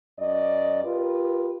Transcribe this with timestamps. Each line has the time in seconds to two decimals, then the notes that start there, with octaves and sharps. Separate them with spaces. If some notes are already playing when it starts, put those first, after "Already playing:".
0.19 F#2 D5 D#5
0.84 F4 G4 A#4 B4